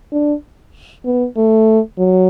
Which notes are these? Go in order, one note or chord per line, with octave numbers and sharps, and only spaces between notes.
D4
B3
A3
F#3